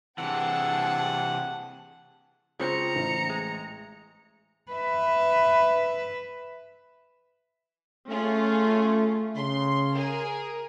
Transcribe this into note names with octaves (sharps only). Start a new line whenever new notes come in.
C3 E3 G#4 F#5 G5 A5
C#3 G#3 C4 F4 A#5 C#7
A1
G#3
B4 E5
A3 C#4 F4 G#4
C#3 C6
G#4 A#4